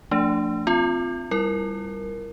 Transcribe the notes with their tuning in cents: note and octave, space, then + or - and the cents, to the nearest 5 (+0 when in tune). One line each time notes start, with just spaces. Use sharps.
F3 +0 A3 +35 D4 +0
C4 -15 F4 +0
G3 +0 E4 +0 A#4 +0